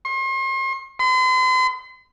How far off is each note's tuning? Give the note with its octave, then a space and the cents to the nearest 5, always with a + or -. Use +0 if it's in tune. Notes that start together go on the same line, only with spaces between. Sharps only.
C6 +40
C6 -45